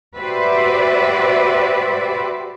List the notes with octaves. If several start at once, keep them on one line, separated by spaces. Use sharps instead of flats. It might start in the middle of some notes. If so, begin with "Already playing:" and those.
F#4 G4 B4 C5 D5 E5